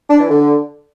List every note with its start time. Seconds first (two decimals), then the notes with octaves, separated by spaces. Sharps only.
0.10 D4
0.20 E3
0.30 D3